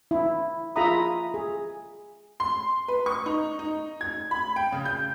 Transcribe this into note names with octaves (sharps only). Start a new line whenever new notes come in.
E4
F4 G#4 E5 A#5 B5 D#6
G#4
C6
B4
C#6
D#4
D#4
G#6
B5
G5
C#3
G6